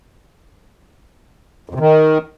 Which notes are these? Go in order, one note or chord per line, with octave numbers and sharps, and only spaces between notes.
F2
C3
D#3